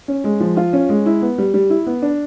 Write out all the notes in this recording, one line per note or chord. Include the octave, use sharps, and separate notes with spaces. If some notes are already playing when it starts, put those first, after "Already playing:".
C#4
G#3
F3
F4
C#4
G#3
E4
B3
G3
G3
E4
B3
D4